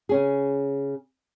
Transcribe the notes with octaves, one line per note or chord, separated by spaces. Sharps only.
C#3 C#4 G#4